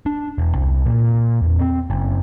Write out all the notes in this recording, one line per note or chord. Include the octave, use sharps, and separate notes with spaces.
D4
E1
C2
A#2
E2
C4
F#1